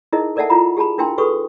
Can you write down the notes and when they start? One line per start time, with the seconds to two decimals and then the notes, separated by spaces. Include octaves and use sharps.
0.13 D#4 E4 G#4 A#4 D#5
0.36 A4 A#4 D5 E5 F#5 A5
0.50 E4 F4 A#5 B5
0.77 G4 G#4 A5 B5
0.98 D4 E4 A#4 G5 G#5 C6
1.18 F#4 G#4 A4 B4 C#6 D#6